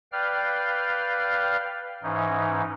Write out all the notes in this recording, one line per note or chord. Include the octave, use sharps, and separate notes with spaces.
B4 D5 F5 G5 F6
G#2 E3 C#4 D#4